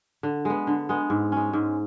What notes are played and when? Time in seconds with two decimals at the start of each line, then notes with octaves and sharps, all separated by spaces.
0.23 D3
0.45 G#3 B3
0.67 D3
0.89 G#3 B3
1.10 G#2
1.32 G#3 C#4
1.53 G#2